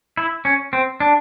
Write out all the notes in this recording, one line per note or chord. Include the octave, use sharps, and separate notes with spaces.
E4
C#4
C4
D4